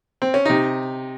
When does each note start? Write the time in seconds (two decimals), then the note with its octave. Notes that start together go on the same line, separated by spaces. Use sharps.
0.22 C4
0.34 C#4
0.45 C3 D#4